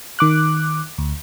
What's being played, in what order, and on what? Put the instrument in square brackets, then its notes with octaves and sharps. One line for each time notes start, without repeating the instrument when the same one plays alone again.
[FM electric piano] D#3 D6 F#6
D2